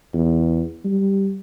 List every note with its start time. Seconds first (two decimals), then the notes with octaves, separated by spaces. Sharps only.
0.14 E2
0.85 G3